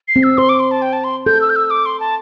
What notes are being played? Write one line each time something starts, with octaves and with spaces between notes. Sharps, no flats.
C7
C4
E6
C5 C6
D6
C6
A5
G5
A5
C6
A4 G6
E6
G6
E6
D6
C6
A5